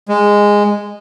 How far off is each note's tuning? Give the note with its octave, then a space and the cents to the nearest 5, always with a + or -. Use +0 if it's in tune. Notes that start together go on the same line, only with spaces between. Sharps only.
G#3 -10